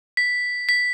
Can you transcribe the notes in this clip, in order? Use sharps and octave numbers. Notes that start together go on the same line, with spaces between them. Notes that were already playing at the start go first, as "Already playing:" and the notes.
B6
B6